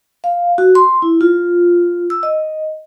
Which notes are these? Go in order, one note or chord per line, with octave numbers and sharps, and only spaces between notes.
F5
F#4
C6
E4
F4
E6
D#5